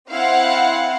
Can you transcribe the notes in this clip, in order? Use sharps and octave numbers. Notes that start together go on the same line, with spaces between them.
C4 E4 F5 F#5